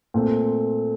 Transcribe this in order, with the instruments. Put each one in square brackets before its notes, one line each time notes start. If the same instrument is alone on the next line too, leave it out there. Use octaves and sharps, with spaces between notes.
[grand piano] A#2 A3 C4